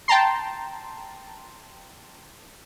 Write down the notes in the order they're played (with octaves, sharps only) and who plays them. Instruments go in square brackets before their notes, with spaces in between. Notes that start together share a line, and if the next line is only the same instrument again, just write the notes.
[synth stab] G5 A5 A#5 C6